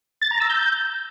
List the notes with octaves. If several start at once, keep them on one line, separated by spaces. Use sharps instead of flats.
A6
A#5
E6
G6